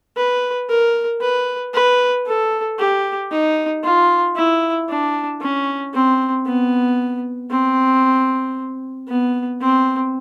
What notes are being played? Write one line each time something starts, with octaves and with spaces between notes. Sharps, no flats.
B4
A#4
B4
B4
A4
G4
D#4
F4
E4
D4
C#4
C4
B3
C4
B3
C4